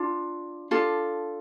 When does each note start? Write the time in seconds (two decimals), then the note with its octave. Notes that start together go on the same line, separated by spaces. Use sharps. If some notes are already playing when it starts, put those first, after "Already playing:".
Already playing: D4 F4
0.71 D4 F4 A4